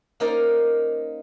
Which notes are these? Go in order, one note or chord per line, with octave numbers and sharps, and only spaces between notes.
A#3 C#4 D#4 A#4 C5 D5